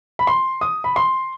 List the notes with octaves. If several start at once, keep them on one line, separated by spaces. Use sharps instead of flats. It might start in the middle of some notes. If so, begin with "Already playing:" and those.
B5
C6
D#6
B5
C6